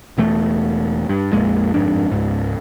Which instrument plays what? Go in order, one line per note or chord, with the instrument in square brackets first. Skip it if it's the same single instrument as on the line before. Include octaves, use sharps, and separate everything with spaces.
[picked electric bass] E1 E2 A3
G2
A#1 F2 A#2 G#3
G1 F2 G#2 D4
C#2 G#2